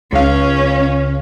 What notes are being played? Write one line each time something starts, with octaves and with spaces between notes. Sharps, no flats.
C#2 C#4 F5